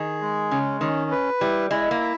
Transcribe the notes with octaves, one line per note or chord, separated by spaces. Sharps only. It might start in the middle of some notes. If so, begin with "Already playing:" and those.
Already playing: D#3 G#4
G#3
C#3 C#4
D#3 C#4
B4
G3 E4
G#3 E4
A#3
E5